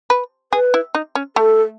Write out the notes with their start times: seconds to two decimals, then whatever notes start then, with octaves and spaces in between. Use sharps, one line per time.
0.10 B4
0.53 G#4 B4
0.74 E4
0.95 D#4
1.15 C#4
1.36 A3 A4